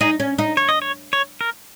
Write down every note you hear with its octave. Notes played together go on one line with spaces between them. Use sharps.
D#4 G#4
C#4
D#4
C#5
D#5
C#5
C#5
A#4